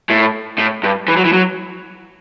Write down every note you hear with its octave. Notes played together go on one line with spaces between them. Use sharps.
A2
A2
G2
E3
F#3
E3
F#3